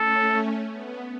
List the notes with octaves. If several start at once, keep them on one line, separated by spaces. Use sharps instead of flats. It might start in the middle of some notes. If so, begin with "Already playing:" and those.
Already playing: A3 C#4 A4
B3